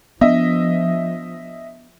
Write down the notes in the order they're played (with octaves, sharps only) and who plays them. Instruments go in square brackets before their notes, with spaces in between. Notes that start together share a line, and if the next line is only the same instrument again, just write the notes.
[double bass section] F3 [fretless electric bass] B3 D4 [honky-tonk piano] D#5 E5